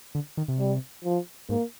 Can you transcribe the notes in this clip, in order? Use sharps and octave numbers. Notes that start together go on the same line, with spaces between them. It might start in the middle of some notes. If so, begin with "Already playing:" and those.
D3
D#3
C3
G3
F3
G#2 A#3